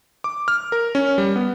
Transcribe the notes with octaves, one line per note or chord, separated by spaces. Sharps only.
D6
F6
A#4
C#4
G3
B3